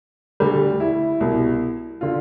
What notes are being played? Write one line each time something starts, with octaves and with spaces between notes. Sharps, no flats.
D2 D3 G3
E4
C2 B2
D3 F4